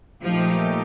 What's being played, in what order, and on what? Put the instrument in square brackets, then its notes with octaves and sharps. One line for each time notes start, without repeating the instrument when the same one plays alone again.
[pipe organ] A#2 A3 D#4 G4 [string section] F3